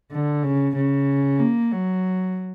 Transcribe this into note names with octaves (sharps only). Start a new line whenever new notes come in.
D3
C#3
C#3
A#3
F#3